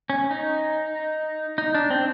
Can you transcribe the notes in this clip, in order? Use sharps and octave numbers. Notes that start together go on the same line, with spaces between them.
C#4
D#4
D#4
D4
C4